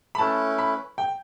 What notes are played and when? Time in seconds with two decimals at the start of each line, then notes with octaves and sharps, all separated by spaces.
0.15 B5
0.18 A3 C#4 E4 B4 A5
0.58 B5
0.98 G5